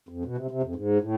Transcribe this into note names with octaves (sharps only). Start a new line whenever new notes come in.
F2
B2
C3
C3
F2
G#2
A2